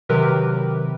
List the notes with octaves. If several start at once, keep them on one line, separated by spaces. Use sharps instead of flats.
C3 D#3 F#3 G4 A#4 B4